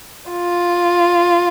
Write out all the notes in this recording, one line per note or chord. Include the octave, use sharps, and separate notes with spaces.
F4